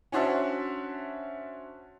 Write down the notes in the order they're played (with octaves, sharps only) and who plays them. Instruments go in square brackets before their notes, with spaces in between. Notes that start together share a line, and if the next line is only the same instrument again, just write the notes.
[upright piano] C#4 D4 F#4 C5 E5 A5